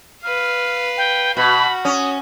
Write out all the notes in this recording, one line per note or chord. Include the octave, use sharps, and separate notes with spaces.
B4 F5 F6
G5
B2 F#4 B5
C#4 D#6